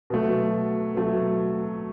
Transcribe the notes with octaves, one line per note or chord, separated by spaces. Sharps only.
B2 F#3 A3
B2 F#3 A3